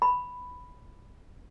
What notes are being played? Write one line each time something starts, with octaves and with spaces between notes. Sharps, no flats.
B5